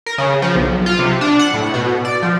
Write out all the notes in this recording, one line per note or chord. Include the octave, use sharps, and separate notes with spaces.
A#4
C#3
F3
B1
F4
C3
D4
F#5
A2
B2
D5
F3